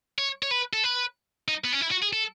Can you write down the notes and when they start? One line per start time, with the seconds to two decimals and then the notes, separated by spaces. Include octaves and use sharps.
0.19 C#5
0.43 C#5
0.51 B4
0.73 A4
0.84 B4
1.48 D#4
1.64 B3
1.72 C#4
1.81 E4
1.91 F#4
2.02 G#4
2.13 A4